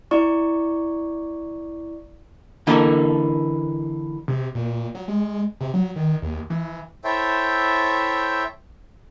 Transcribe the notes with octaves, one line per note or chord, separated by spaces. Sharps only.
E4 D5 C#6
D3 E3 A#3 D#4 A4
C3
A#2
F#3
G#3
C3
F#3
D#3
D#2
E3
E4 A4 C5 C#5 E5 G5